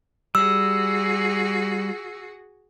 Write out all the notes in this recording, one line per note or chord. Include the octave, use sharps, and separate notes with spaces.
G3 F#4 G#4 E6